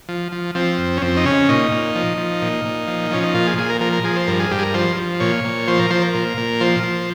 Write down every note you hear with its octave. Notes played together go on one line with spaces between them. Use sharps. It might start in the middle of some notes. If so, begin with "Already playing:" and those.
F3
F3
F3 C4
F2
C#4
F2 C4
D#4
C#3 C#4
A#2 D#4
A#2
F3
F3
A#2
A#2
F3
F3 C#4
D#4
A#2 F4
G#4
A#2 G#4
A#4
F3 A#4
A#4
F3 G#4
C5
G2 A#4
G#4
G2 G4
G#4
A#4
F3 C5
F3
A#2 C#5
A#2
F3 C5
A#4
F3 C5
A#4
A#2
A#2
F3 C5
F3